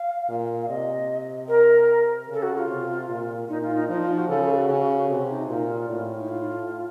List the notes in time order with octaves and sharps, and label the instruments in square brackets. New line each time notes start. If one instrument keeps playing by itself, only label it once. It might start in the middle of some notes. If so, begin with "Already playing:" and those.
Already playing: [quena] F5
[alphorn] A#2
[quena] F5
[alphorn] C3 [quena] D#5
[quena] A#4
[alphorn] C#3 [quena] A4
[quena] F#4
F4
[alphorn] C3
A#2
[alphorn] A#2 [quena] D#4
[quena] F4
D#4
[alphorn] F3 [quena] D#4
[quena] F4
F#4
[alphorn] C#3 [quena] A4
[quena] A4
F4
F#4
[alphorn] C#3
[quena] A4
[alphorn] C3 [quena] F#4
[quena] D#4
[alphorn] A#2 [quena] F4
[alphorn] A2
[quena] D#4
F4